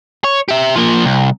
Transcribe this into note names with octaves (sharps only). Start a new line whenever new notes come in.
C#5
G4 E5
F3 A#3
C2